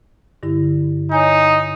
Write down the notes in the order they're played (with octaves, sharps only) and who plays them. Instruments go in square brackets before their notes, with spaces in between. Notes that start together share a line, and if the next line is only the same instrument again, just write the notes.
[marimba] G2 D3 E4
[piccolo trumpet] D#4 [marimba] C#5 G#5